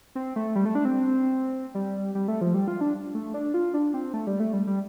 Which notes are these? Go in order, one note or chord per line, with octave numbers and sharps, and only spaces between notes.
C4
A3
G3
A3
D4
C4
G3
G3
A3
F3
G3
F4
D4
A3
D4
F4
D4
C4
A3
G3
A3
G3
G3